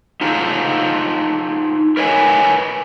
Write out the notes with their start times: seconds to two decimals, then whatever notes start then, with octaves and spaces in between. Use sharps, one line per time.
0.21 D#4 F4 A4 C5
1.97 A#4 B4 C#5 D#5 G5 G#5